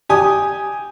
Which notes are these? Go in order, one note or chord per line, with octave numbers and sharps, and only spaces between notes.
G4 G#5 D#6